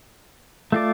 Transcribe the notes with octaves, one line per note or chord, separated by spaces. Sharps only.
A3 F4 D5